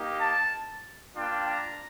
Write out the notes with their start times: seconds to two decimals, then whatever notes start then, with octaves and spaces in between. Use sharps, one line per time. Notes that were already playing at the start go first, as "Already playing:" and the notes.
Already playing: A#3 D#4 G4
0.20 A5
1.16 A#3 D4 F4 G5
1.48 A#5